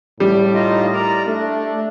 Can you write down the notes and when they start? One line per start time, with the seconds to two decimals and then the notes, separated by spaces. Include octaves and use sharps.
0.20 A2 G3
0.55 D#4 F4 D#5
0.93 A#4 D5 A#5
1.27 A3 D4